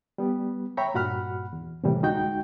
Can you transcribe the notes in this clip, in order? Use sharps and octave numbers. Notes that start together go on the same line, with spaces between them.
G3 B3
C#5 E5 G5 A#5 B5 C#6
G2 A#2 F#4 F#5 B5 F6
E2
A2 C3 E3 G3 A#3
D2 G#3 D#4 F#4 G5 G6